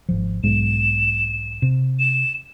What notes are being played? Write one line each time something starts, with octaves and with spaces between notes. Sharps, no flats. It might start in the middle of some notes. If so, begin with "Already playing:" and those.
G#1 C#2 F3
B1 G#2 G#3 E7
C3
E7